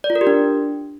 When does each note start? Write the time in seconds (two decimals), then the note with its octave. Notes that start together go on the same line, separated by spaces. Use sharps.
0.04 D5
0.10 F4
0.15 A#4
0.21 G4
0.27 D4